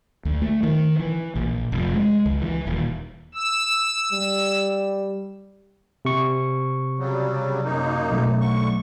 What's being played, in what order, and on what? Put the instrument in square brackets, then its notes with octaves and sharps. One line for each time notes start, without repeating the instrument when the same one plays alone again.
[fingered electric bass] D2
A3
D#3
E3
A#1
F1
G#3
C#2
E3
D#1
[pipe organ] E6
[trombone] G3
[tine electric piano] C3 C#6
[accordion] C#3 F#3 G3
F#2 A#3 D#4
[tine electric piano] B1 A3
[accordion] D3 C#6